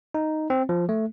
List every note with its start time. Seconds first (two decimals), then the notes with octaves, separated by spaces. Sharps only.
0.14 D#4
0.50 C4
0.69 F3
0.89 A3